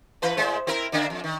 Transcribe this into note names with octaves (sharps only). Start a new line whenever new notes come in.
E3 B4
A2 G#3 C5
C4 E4 A#4
D3 A#3 D4
F2
D#3